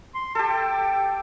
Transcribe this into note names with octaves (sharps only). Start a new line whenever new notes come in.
C6
G4 A4 A5
G5